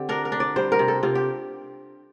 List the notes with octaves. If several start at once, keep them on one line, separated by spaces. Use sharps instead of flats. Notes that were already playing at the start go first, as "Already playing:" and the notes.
Already playing: D3 C4 G4
D4 A#4
A#4
D4
D5
G3 C5
A#4
C3
A4
C3 F4
G4